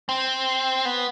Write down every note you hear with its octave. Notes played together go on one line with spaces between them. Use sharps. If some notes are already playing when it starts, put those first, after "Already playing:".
C4
B3